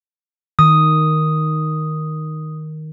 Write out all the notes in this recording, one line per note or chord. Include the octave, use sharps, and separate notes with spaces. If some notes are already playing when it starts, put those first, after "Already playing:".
D#3 D#6